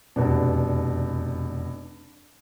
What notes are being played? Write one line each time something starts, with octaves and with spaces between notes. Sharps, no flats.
F1 E2 B2 D4